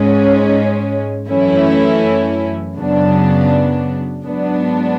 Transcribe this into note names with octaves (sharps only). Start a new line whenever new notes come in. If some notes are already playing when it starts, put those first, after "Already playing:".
Already playing: G#2 G#3 C#4
F#2 E3 A3 C#4 E4
F#2 C#3 F#3 B3 D4
G#2 F#3 B3 D4